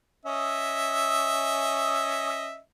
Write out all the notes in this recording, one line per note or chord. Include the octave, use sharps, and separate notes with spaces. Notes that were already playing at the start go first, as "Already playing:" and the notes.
C#4 D#5 E5